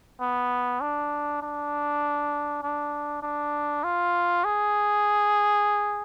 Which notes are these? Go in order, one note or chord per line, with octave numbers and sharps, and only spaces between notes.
B3
D4
D4
D4
D4
F4
G#4